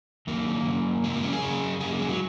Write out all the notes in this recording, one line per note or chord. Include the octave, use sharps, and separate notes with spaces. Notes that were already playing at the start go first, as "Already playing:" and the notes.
F#2 D#3 A#3
F#2 C#3
F#2 C#3 G#3
A#3
C#4
G#4
F#2 C#3
F#2 C#3 G#4
A#3
G#3
F#3